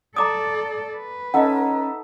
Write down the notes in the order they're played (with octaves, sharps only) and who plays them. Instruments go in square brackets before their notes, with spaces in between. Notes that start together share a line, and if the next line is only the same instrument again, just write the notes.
[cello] A4 D5 [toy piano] A#5 D6 D#6
[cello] B4
[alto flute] C#4 [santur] D#4 A4 E5 [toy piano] D#5 F#5